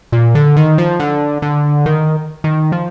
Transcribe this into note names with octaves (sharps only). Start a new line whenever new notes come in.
A#2
D3
D#3
F3
D3
D3
D#3
D#3
F3